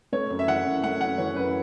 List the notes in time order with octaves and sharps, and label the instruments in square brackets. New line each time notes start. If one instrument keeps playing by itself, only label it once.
[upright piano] A3 C#5
F#2
E5
E3 F#5
F#2
A3 F#5
F#2 F#5
E3 C#5
F#2 B4